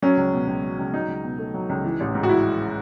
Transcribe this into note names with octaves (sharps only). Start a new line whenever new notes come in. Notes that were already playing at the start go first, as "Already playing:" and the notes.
F#3 C#4
C#2
B2
C#2
F#3
C#2
F#3 D#4
C#2
B2
A3
F#3
C#2
E3
A1
G#2
F#4
E4